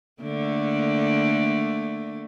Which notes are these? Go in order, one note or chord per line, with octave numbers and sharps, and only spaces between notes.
D3 A3 A#3